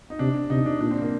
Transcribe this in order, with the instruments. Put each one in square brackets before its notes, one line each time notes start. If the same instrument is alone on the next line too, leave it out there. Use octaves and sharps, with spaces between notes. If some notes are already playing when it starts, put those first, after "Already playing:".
[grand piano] D#4
[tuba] C3 [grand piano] D4
[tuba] C3 [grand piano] D#4
[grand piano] D4
[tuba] A#2 [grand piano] D4
[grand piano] C4
A#3